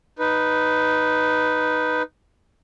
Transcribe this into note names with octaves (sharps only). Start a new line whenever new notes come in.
D#4 B4